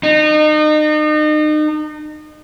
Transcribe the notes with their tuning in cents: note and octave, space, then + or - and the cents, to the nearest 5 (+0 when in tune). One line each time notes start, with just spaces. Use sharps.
D#4 -35